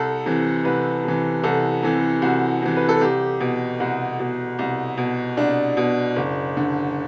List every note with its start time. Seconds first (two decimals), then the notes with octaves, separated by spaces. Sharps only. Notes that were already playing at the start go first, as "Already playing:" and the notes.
Already playing: C2 A4
0.26 C3 E3
0.65 C2 B4
1.04 C3 E3
1.44 C2 A4
1.83 C3 E3
2.22 C2 F#4
2.62 C3 E3
2.76 B4
2.89 A4
3.01 C2 G4
3.40 B2
3.80 C2 F#4
4.20 B2
4.59 C2
4.97 B2
5.37 C2 D4
5.77 B2
6.16 F#1
6.57 D3